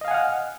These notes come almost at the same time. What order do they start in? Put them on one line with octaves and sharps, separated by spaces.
D#5 F5 G#5 F#5 F6